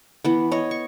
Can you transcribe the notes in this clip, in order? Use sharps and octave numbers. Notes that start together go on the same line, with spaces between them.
E3 B3
C#5 D#5
C#6